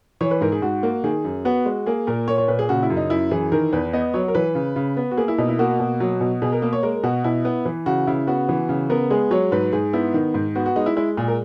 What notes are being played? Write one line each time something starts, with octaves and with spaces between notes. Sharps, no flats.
E3 C#5
B4
G#2 A#4
G#4
G#2 F#4
A#3
D#3 G#4
F#2
B3 F#4
G#3
A#3 G#4
A#2 A#4
A#3 C#5
C#5
A#2 B4
G#4
C#3 F#4
E4
F#2
D#4
F#2 E4
E3 G#4
D#3 A#4
E2 B4
B3 D#5
F#3 C#5
A#4
E3 B4
C#3
C#3
B3
F#4
A#3 G#4
E4
B2 D#4
E4
A#3 F#4
B2
F#3
B2
B2 G#4
A#4
A#3
C#5
G#3 A#4
B2 F#4
B2 E4
B3
E3
C#3 F#4
C#3 E4
B3 F#4
E3
C#3
B3 A#4
G#3 G#4
F#3 C#5
G#2 B4
G#2 G#4
B3 E4
D#3
G#2
B3 F#4
F#4
G#3 D#4
E4
G#3 E4
A#2 G#4
A#4